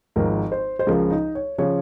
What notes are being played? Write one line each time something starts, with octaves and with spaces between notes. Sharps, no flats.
G#1 G#2 F3 A#4
C5
C5
C#2 C#3 F3 A#4
D#4
C#5
C#3 F3 C#5